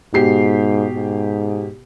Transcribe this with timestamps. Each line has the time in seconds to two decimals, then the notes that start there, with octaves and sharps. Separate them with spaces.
0.14 G#2 B2 G4 C7
0.93 G#2